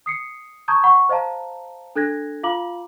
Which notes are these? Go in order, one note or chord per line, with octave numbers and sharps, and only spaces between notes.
D#6 C7 C#7
A5 A#5 C#6 D#6 G6 G#6
F#5 B5 C#6
C5 D#5 F5 A5 A#5
D4 A4 F#6 G#6 A#6
F4 F5 A#5 D6 F#7